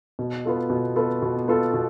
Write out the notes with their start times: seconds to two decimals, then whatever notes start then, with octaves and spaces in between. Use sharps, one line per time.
0.19 B2
0.45 B3 F4 A4
0.70 B2
0.96 B3 F4 A4
1.22 B2
1.48 B3 F4 A4
1.74 B2